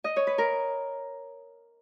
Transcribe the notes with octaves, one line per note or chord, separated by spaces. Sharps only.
D#5
C#5
B4
A#4